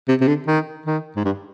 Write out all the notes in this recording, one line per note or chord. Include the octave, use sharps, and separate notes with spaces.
C3
C3
D3
D#3
D#3
G#2
G2